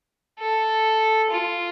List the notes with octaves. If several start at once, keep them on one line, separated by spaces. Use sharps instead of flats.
A4
F4